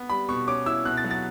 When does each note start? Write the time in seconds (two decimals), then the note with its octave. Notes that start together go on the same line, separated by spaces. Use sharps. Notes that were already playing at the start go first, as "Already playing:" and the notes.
Already playing: B3
0.10 G3 B5
0.28 B2 C#6
0.47 C#4 D6
0.66 E4 E6
0.85 B2 F#6
0.97 A6
1.04 F#3
1.11 A6